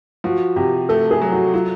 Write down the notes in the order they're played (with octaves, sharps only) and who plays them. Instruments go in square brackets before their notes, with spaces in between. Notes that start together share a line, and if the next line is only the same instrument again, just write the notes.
[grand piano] F3 [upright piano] F#4
[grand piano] C3 [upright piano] G4
[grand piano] A3 [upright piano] A4
[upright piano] G#4
[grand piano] F#3
[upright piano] F#4
[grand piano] F#3 [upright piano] F4